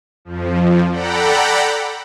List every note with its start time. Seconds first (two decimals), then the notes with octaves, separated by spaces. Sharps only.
0.25 F2 F3
0.89 A4 D5 F#5 G5 A#5 B5